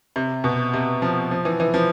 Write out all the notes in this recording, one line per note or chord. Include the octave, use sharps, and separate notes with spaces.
C3
B2
C3
F3
F3
E3
E3
F3